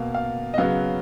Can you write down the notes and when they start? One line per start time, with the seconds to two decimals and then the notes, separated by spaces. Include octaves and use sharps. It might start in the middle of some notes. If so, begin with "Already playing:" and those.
Already playing: B2 A#3 F5
0.14 F5
0.54 D#5
0.58 C#3 F#3 B3 F5